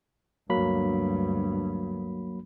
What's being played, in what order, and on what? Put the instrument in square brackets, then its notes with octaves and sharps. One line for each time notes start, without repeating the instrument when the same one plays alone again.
[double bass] D2 G2 [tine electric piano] F#3 A#3 B5